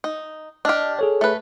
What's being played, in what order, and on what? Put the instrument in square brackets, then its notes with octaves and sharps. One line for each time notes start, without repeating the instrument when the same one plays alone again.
[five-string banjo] D#4
[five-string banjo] D4 G4 [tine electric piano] D#5 F6
[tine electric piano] G#4 A4 C#5
[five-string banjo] A3 B4